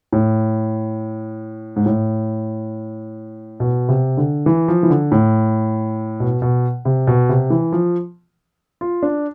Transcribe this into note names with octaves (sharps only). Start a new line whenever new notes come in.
A2
G#2
A2
B2
C3
D3
E3
F3
E3
D3
A2
B2
B2
C3
B2
C3
E3
F3
F4
D4